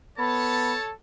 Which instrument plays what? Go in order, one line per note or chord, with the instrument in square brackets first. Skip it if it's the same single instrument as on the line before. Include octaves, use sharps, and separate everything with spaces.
[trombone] B3 [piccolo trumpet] A4 [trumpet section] C#5 A5 [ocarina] B5